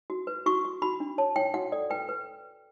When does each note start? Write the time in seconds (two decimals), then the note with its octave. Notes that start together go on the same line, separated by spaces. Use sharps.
0.10 F#4
0.27 B4
0.46 F#4 C#6
0.64 F#4
0.82 F#4 B5
1.00 D4
1.18 C#5 A5
1.36 C#5 G5
1.54 F#4 F#5
1.72 A4 D5
1.90 B4 G5
2.09 B4